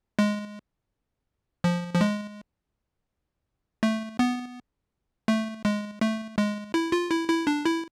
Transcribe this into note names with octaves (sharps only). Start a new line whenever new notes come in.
G#3
F3
F3
G#3
A3
B3
A3
G#3
A3
G#3
E4
F4
E4
E4
D4
E4